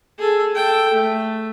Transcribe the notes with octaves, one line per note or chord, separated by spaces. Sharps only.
G#4 A4
A4 G5
A3